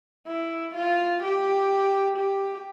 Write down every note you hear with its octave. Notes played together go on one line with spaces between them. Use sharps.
E4
F4
G4
G4